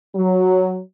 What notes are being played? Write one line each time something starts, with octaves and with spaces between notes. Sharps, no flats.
F#3